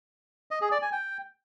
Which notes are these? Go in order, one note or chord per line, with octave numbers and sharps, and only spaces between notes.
D#5
G#4
D5
G#5
G5